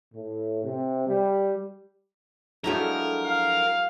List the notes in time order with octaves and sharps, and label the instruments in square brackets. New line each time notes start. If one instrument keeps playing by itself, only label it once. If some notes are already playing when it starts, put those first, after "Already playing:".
[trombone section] A2
C3
G3
[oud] F3 A3 D4 [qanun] F#3 G#3 E4 [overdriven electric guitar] A#4
[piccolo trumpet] F5